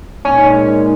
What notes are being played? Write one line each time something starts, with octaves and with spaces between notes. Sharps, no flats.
A#2 G#3 C#4 D#4